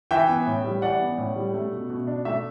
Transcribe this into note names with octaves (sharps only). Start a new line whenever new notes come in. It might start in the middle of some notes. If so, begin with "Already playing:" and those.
E3 E5 G5
B3
A2
G3
E3 D5 F#5
B3
A2
G3
A3
B2
B2
D4
A3 E5